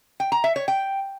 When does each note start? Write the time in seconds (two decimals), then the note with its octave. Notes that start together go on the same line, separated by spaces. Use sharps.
0.20 G5
0.32 A#5
0.44 E5
0.56 C#5
0.68 G5